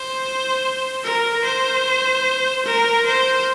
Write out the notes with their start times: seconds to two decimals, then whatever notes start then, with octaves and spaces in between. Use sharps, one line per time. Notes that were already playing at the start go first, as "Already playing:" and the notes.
Already playing: C5
1.04 A#4
1.45 C5
2.66 A#4
3.06 C5